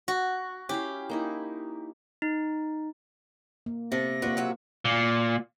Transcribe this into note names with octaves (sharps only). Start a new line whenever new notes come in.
F#4
C#4 E4 G4 F5
A#3 D#4 E4
D#4
A#3
C3 A4 A#6
A#3 D4 F4 F#4 B4
F#3 F#4 E5
A#2